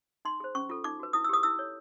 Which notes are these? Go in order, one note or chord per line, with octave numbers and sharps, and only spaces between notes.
D#4 C6
G#4 C5
C#4 C#6
F4 A4
D#4 D6
F#4 B4
E4 D#6
E6
G4 B4 D#6
E4 E6
A4 C#5